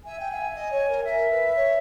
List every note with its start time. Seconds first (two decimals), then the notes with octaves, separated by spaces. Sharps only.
0.04 E5 G#5
0.19 G5
0.30 G5
0.34 E5
0.54 D#5
0.71 C#5
0.88 A#4
1.04 A#4 E5
1.30 B4
1.55 C#5